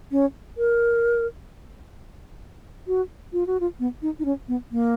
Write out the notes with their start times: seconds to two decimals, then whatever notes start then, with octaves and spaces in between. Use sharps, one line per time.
0.12 C#4
0.58 A#4
2.88 F#4
3.33 F4
3.47 F#4
3.60 F4
3.79 B3
4.02 D#4
4.19 D#4
4.25 C#4
4.48 B3
4.72 A#3